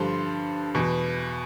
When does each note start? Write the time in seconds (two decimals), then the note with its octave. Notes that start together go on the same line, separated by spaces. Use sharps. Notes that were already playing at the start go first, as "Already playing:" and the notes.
Already playing: G2 D3 F3 C6
0.75 E2 B2